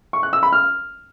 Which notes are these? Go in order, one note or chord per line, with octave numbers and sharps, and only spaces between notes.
C#6
F#6
E6
B5
F6